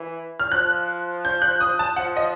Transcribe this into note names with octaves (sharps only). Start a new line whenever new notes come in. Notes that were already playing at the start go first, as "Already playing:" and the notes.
Already playing: E3
F6
F3 F#6
G6
F#6
D#6
A5
F3 F#5
D#5